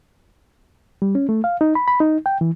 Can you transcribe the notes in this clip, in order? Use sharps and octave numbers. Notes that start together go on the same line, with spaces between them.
G3
C#4
A3
F5
D#4
B5
B5
D#4
G5
E3